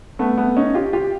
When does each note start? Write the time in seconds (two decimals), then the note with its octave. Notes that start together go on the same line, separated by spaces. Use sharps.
0.19 A3 B3
0.38 A3 B3
0.57 C#4 D#4
0.74 F4 G4
0.93 F4 G4